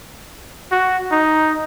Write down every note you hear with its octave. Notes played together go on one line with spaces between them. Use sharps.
F#4
D#4